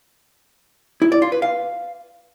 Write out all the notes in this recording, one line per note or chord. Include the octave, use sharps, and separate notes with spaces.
E4
D5
F4
B4
F5